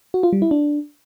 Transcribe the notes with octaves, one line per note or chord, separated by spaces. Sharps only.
F#4
F4
G3
E4
D4